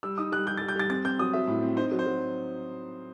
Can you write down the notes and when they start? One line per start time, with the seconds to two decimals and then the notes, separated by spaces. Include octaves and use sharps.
0.03 G3 E6
0.18 D#4 D#6
0.32 G3 F#6
0.47 G3 G6
0.57 A6
0.61 G3
0.68 G6
0.76 G3 A6
0.90 C4 A6
1.05 C4 G6
1.19 F#3 D#6
1.33 F#3 E5
1.47 A2
1.63 C4
1.77 D#4 C5
1.91 F#3
1.99 C5
2.06 F#3